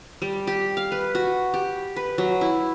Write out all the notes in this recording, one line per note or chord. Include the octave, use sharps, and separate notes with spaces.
G3
G4
F5
B4
F#4
G4
B4
F#3
E4